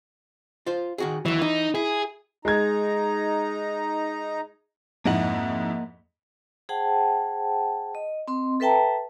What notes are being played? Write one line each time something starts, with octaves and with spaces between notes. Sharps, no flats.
F4 C5
D#3 F#4 G#4
D#2 E3 F#3
E3 D#4
E4 G#4
G#3 D#4 A#5 G#6
F2 G#2 A#3 E4 D#5 F#5
G#4 C5 F#5 G5 A5
D#5
C4 D#5 C6
A4 B4 E5 G5 A5 A#5